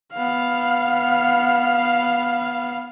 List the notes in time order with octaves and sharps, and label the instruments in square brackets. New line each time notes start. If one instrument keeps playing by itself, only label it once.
[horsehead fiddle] B3 F5